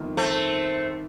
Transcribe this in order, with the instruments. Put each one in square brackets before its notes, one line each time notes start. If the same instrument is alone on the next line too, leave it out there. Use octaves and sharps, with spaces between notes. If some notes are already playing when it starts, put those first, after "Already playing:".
Already playing: [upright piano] G1 F2 D#3
[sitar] A3 C4